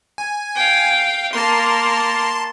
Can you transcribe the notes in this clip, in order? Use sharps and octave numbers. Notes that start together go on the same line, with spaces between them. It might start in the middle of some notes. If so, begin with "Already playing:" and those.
G#5
F5 G5
A#3 A5 C6 F6